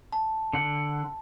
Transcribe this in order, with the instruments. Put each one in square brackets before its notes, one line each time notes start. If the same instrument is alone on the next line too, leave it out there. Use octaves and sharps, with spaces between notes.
[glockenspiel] A5
[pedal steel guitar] D3 F#5